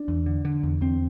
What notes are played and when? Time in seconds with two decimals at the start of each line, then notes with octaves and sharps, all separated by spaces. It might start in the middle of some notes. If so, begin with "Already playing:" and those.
Already playing: D4
0.08 E2
0.26 D3
0.45 D3
0.63 E2
0.81 E2 C4